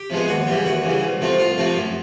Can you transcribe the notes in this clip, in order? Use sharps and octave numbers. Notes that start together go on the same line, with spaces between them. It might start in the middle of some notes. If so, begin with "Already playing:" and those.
Already playing: G4
C3 F3 G#3 B3
D#2 F#4
C#3 E3 G3 G4
D#2 F#4
C#3 E3 G3
C2
C3 F3 A3 C4
C2 F4
C3 F3 A3 C4
F#2